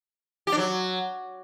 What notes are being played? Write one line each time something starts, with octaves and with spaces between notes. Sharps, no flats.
G4
D4
F#3